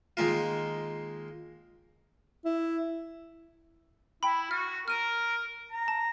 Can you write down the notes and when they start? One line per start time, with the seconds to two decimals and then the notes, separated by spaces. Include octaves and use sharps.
0.17 D#3 G#3 A#3 F4
2.45 E4
4.23 E4 G5 B5
4.51 F#4 F6
4.88 A#4 F6 D#7
5.72 A#5
5.88 A5